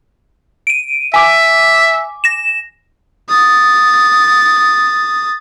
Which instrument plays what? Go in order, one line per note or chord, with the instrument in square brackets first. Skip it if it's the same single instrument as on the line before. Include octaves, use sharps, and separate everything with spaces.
[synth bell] D7 D#7
[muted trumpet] E5 [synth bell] G#5 D6
[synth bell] A#6 E7
[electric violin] D#6 A6